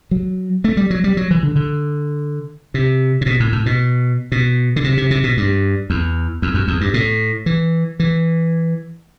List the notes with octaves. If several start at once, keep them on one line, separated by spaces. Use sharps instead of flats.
F#3
A3
G3
F#3
G3
F#3
E3
D3
D3
C3
C3
B2
A2
A2
B2
B2
D3
C3
C3
C3
B2
G2
E2
E2
F#2
E2
G2
A2
E3
E3